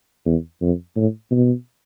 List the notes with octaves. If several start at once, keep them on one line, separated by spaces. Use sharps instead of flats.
E2
F2
A2
B2